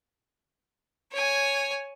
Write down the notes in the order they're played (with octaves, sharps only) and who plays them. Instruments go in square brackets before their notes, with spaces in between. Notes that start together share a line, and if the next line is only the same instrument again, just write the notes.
[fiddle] C#5 G#5